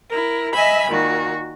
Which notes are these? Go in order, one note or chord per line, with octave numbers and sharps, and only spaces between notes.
E4 A#4
D#5 E5 G#5 B5
A#2 D#3 F#4